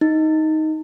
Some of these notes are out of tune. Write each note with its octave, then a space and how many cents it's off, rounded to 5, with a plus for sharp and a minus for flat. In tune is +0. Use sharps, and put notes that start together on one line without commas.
D#4 +10